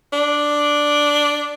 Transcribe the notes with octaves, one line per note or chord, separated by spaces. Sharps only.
D4